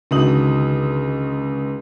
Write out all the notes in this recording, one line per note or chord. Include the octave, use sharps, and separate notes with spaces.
C#2 D3 D#3 F#4 D#6 F#7